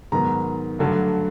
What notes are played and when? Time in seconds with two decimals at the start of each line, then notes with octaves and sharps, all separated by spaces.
0.12 G#2 D#3 F#3 B3 A#5
0.79 G2 D3 F#3 A3